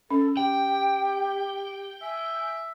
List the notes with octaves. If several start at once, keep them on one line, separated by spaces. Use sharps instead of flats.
C#4 A4
G4 G5
E5 G#5